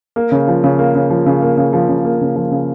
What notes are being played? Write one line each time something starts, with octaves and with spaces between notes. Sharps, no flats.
A#3
C#3
F3
C#3
A#3
C#3
F3
C#3
A#3
C#3
F3
C#3
A#3
C#3
F3
C#3